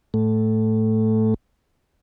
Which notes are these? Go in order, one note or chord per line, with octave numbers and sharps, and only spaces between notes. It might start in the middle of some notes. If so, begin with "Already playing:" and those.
A2 A3